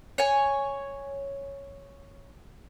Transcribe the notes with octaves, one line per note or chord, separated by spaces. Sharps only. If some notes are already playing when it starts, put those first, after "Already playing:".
C#5 G#5